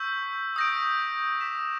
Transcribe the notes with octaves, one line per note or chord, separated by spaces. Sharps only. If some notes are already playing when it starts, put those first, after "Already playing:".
Already playing: C#6 E6 G6 B6
D#6 G6 A#6 D7
D6 G6 B6 E7